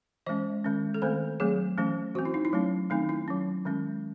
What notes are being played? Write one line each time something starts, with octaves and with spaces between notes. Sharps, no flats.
E3 G#3 C#4 D#5
D#3 G#3 C#4
A4
D#3 A3 C4 C5
F#3 A3 C4 G#4
E3 A3 C#4
E3 C4 F#4
E4
D#4
E4
F#3 A3 C#4
D#3 A3 C4 D#4
E4
F#3 C#4
D#3 G#3 C#4